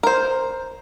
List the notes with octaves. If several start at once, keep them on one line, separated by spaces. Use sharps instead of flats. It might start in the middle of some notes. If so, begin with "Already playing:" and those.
A#4 C5